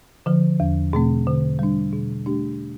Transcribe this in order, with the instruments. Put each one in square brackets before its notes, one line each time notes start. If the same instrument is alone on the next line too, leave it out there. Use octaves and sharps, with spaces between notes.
[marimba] D3 F3
E2
B2 A3 C4
D3
G3 D4
B2
A3 D4 G4